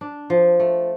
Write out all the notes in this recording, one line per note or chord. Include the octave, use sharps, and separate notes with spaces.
D4
F3
A3